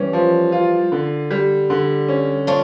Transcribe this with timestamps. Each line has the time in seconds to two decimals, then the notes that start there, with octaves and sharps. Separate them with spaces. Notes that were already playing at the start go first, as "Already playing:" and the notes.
Already playing: E3 G3 C#4
0.13 F3
0.52 F4
0.92 D3
1.31 G3
1.70 D3
2.08 C#4
2.47 D4 F4 C#5